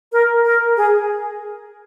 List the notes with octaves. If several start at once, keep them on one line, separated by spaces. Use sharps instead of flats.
A#4
A#4
G#4